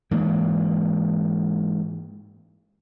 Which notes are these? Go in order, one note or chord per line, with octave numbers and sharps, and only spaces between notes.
G#2 E3 A#3